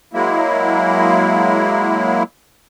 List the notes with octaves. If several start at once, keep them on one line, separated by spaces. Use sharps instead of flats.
F#3 G#3 A#3 E4